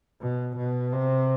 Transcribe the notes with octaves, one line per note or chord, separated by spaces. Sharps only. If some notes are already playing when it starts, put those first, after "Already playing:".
B2
B2
C3